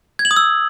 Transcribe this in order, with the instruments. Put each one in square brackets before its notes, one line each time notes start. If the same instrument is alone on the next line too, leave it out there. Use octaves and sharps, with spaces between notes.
[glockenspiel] G#6
F#7
D#6
E6